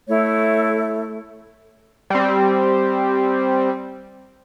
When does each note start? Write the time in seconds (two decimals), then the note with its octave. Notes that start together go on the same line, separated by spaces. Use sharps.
0.08 A3 E4 C#5
2.10 G3 C4